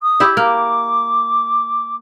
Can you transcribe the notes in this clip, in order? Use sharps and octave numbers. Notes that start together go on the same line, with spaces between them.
D#6
E4 G4 E5
A#3 D6